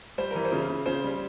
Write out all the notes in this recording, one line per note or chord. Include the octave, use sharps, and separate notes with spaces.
G3 C5
E3 A#4
C5
C#3
C#3
C#3 C5
G3